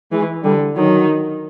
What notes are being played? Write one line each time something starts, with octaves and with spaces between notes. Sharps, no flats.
E3 G#3
D3 G3
D#3 F#3